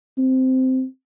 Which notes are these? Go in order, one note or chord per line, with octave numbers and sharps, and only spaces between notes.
C4